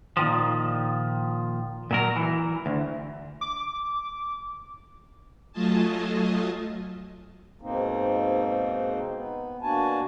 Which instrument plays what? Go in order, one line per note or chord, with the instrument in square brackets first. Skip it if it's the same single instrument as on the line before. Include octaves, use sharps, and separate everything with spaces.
[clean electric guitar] A#2 D#3 F3
A#2 F#3 A#4
E3
D2
[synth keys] D6
[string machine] F#3 A3 F4 D#5 G#5 A5
[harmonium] G#2 B2 A#3 C4 D#4
B3
B2 A#3 D4 F#4 G#5 A5